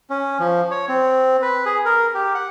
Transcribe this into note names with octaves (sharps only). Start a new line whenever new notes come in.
C#4
F3
C#5
C4
B4
G#4
A#4
G4
F#5